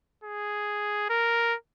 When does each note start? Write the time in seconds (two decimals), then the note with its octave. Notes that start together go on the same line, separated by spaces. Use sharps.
0.24 G#4
1.10 A#4